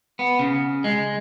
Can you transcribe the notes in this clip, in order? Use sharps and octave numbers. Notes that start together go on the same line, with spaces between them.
B3
C#3
G#3